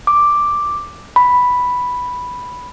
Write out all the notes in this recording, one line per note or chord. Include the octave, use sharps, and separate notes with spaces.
D6
B5